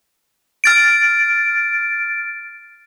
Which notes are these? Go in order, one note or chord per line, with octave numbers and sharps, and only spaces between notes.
F6 A6 D7